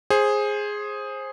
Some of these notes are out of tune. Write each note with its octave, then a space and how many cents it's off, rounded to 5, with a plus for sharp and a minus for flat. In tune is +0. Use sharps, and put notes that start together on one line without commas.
G#4 +0 C5 +20